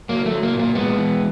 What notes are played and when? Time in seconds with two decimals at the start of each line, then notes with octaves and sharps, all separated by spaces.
0.09 F#3 A#3
0.26 F#3 A3
0.43 A#3
0.53 A#2
0.59 A#3
0.75 G#3 B3
0.98 E3